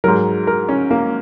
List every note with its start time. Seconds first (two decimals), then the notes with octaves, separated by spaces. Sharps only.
0.04 G#2 F#3 A#4
0.47 A#4
0.69 C#4
0.91 A#3